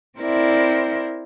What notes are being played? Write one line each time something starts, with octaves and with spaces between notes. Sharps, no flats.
C4 E4 A#4 C5 D5 E5